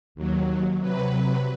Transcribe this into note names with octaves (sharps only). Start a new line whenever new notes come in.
D#2 F#3
C3 F#3 B4